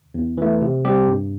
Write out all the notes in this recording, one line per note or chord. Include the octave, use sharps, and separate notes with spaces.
E2
E3 A3
C3
G3 C4 G4
G2